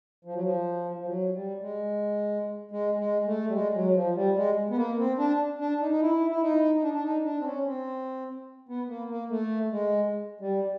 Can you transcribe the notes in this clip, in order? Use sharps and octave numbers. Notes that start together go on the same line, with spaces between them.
F3
F#3
F3
F3
F#3
G3
G#3
G#3
G#3
A3
G3
G#3
F#3
F3
G3
G#3
B3
A#3
C4
D4
D4
D#4
D#4
E4
E4
D#4
D#4
D4
D4
D#4
D4
C4
C#4
C4
B3
A#3
A#3
A3
G#3
G3